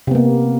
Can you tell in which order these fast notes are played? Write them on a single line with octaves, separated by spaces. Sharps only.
C3 B3 A#3